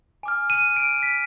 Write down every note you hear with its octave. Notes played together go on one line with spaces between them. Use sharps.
G#5 D6 F6
D#7
D7
B6